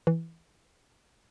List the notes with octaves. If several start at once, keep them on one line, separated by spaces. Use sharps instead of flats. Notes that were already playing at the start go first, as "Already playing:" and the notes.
E3